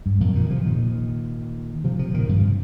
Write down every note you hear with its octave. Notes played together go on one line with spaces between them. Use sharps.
G2
F2 A#2
F3
A#2 D#3
C3 F3
A#2 D#3
C3 F3
C3 F3
A#2 D#3
G2 C3